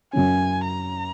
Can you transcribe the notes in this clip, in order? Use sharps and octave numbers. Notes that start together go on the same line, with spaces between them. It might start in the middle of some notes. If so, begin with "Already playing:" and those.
F#2 F#3 C#4 G#5
A#5